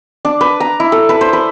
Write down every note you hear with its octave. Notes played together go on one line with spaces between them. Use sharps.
D4
B4
A#5
E4
A4
B4
C5
B4